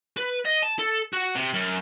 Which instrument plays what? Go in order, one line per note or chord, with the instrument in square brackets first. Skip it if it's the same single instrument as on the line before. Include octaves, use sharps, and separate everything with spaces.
[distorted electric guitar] B4
D#5
A5
A4
F#4
C3
F#2